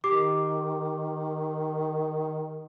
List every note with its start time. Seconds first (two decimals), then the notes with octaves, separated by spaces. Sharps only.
0.04 D#3 G4 D6